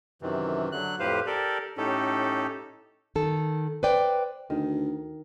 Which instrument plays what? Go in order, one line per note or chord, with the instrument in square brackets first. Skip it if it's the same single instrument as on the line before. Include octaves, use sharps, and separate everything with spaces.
[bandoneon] F#2 C3 D#3 E3
D3 F#3 F#6
F2 A2 G4 B4 C5 F5
G4 A4 A#4 D5
A2 C#4 D#4 G4 A4
[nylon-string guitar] D#3 A4
B4 C5 D5 G5
[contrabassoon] D2 [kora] D#3